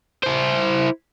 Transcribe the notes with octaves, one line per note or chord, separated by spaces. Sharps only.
E4 C5